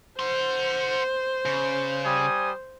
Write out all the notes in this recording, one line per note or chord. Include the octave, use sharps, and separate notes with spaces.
C5 F#5 C6
C#3
G3 G#5 D#6